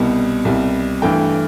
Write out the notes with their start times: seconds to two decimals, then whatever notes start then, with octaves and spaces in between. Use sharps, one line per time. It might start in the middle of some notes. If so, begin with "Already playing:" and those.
Already playing: C2 B2 G3
0.45 C2 B2 G3
1.02 G2 E3 A3 G5